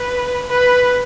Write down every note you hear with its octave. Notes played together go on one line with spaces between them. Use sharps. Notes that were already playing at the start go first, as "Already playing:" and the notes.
Already playing: B4
B4